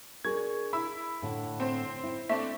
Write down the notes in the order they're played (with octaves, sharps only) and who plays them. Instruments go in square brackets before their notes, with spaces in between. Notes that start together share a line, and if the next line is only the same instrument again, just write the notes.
[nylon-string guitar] D4 G#4 A#4 [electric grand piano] C#6 G#6
[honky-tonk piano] E4 [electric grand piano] B5 E6
[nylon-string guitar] A2 D3
[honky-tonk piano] C4 C5
[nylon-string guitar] E4
[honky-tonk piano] A3 C4 D4 [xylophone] E5 [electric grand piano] C#6